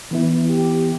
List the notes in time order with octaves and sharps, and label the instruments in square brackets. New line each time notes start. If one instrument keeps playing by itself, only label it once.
[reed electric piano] E3 B3 E4
[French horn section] G4